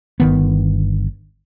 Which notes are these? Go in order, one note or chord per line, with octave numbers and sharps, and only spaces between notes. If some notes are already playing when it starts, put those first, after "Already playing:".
G1 D#3 B3